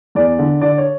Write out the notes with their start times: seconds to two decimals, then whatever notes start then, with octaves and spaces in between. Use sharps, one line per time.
0.15 E2 D5
0.39 D3
0.61 D3 D5
0.78 C#5